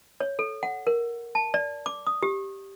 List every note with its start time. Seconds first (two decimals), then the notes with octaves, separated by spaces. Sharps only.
0.20 C#5
0.39 A4
0.63 F#5
0.87 A#4
1.35 A5
1.54 D5
1.86 D6
2.07 D#6
2.23 G4